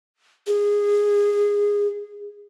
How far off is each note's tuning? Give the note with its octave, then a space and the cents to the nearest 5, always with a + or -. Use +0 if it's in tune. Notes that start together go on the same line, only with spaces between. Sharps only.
G#4 -15